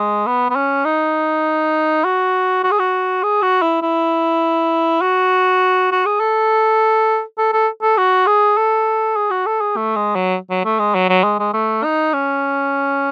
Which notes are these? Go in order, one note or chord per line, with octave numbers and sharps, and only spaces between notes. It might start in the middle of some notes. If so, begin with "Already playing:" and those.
Already playing: G#3
B3
B3
C#4
D#4
F#4
F#4
G#4
F#4
G#4
F#4
E4
E4
F#4
F#4
G#4
A4
A4
A4
A4
F#4
G#4
A4
G#4
F#4
A4
G#4
A3
G#3
F#3
F#3
A3
G#3
F#3
F#3
G#3
G#3
A3
D#4
C#4